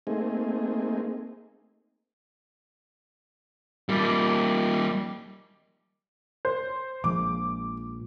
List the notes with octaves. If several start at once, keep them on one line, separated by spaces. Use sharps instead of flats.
A3 A#3 C4 D#4 G#4
G3 A#3
C5
A#1 F3 G#3 D6